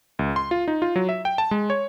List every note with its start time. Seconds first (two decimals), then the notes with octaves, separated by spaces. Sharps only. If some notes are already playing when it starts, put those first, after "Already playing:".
0.19 C#2
0.36 C6
0.51 F4
0.68 D#4
0.82 F4
0.96 F#3
1.09 E5
1.25 G5
1.38 A5
1.51 G#3
1.70 C#5